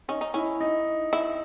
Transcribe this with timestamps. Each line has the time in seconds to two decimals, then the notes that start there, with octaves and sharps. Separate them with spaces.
0.08 C#4 D#4
0.21 D#4
0.34 C#4 E4
0.60 D#4
1.13 E4